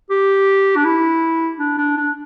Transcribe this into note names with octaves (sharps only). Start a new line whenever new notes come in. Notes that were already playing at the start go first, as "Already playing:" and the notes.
G4
D4
E4
D4
D4
D4